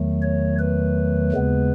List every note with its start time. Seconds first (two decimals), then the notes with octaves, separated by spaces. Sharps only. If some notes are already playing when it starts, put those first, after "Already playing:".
Already playing: E2 D#3 F#3 A3
0.22 C#5
0.59 B4
1.32 D#2 C#3 G#3 B3